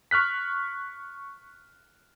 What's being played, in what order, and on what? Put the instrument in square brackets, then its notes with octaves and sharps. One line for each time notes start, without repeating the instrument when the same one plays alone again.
[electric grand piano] C#6 F6 F#6 B6